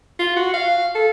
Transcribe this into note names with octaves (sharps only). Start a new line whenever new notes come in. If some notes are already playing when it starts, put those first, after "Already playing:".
F4
F#4
F5
A4